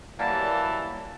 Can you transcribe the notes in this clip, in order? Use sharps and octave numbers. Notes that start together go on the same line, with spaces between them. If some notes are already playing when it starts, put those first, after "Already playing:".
E3 F#3 G3 A#3 A5